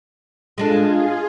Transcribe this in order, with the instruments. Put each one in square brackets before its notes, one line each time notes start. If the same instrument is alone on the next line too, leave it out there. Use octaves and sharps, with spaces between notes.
[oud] G#3 D4 A4 [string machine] F4 G#4